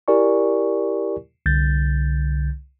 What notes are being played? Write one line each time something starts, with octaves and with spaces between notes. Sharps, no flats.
E4 G4 A#4 D5 G#5 C#6
C2 D3 G6 A6